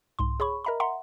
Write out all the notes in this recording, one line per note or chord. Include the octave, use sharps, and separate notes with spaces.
C2 G#2 C6
G#4 C#5 B5 C#6
A#4 D#5 E5 A#5 B5
E5 F#5 A#5 C6